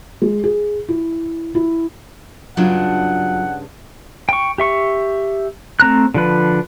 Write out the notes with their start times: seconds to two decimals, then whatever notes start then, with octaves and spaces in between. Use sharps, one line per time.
0.22 G#3
0.44 G#4
0.89 E4
1.55 E4
2.57 G2 C#3 F#3 D4 F4 F#5
4.29 G5 C#6
4.58 G4 E5 C#6
5.80 A3 C4 A#5 F#6
6.14 D3 F3 B4